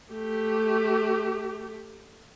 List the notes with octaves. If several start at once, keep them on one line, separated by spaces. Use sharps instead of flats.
A3 G4